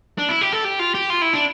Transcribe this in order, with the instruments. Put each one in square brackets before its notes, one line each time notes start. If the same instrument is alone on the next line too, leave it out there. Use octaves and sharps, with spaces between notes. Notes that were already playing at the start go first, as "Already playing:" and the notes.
[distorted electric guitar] D4
E4
G4
A4
G4
F4
G4
F4
E4
D4